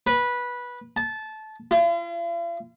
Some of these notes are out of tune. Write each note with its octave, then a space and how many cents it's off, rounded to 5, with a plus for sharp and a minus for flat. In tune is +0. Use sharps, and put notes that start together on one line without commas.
B4 -15
A5 -20
F4 -45